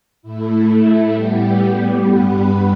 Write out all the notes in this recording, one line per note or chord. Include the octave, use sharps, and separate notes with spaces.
A2 A3 E4
A2 G3 B3 G4
G2 G3 B3 B4